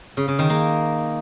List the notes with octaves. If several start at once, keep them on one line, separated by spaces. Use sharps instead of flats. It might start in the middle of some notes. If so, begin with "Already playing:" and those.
C#3
C#3
D#3
A#3